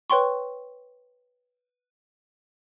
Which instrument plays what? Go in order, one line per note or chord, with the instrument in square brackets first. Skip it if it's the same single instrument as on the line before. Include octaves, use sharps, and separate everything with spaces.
[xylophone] B4 C#5 G5 C6 C#6